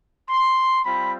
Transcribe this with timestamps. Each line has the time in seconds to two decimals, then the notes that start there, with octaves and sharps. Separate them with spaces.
0.29 C6
0.85 G3 C4 F4 B5